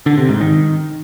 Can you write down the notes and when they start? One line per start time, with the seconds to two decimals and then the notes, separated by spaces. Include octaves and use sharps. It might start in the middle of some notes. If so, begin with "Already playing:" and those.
0.06 D3
0.18 C3
0.29 G#2
0.41 D#3